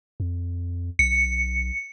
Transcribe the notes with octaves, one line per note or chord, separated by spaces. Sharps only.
F2
B1 C#7